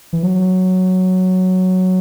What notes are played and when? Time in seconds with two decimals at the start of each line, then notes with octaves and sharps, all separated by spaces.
0.13 E3
0.23 F#3